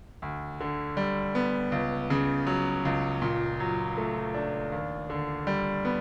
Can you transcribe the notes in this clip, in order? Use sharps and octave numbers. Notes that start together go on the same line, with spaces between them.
D2
D3
G3
B3
C#2
C#3
F#3
C#2
A#2
F#3
A3
D4
D#2
D3
G3
B3